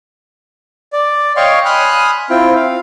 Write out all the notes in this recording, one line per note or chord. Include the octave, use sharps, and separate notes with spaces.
D5
C#5 D#5 F5 G5 C6 C#6
G#5 B5 C6 D#6 F6 F#6
C4 E4 F4 G5
F5